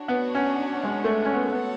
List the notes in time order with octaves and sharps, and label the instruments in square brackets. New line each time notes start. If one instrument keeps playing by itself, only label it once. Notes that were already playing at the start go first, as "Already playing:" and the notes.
Already playing: [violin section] D4 F#4 C#5
[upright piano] B3
C#4
G#3
A3
C#4
B3
[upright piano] A3 [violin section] F#4 A4 C#5 F#5 A5
[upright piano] B3